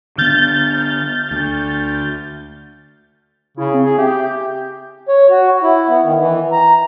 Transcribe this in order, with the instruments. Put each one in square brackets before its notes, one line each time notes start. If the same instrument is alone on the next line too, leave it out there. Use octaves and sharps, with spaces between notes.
[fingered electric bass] D3 B3 [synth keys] F6 G6 A6
[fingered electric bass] D2
[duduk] C#3 [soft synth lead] E4
[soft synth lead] C4
[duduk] G#4
[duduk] G4 [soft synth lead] E5
[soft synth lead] G6
[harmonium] C#5
F#4
E4
B3
D#3
E3
A#5